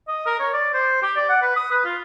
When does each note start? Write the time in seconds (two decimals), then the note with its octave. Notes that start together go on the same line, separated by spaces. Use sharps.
0.08 D#5
0.26 A#4
0.39 C#5
0.53 D5
0.74 C5
1.02 G4
1.16 D5
1.29 F#5
1.42 B4
1.56 D#6
1.71 B4
1.85 F4